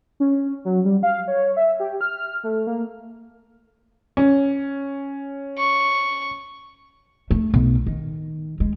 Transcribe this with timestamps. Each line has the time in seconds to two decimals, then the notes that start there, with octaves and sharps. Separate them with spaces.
0.20 C#4
0.65 F#3
0.85 G3
1.03 F5
1.28 C#5
1.57 E5
1.80 G4
2.01 F6
2.44 A3
2.67 A#3
4.17 C#4
5.58 C#6
7.31 A3
7.54 B1
7.87 D#3
8.60 G#3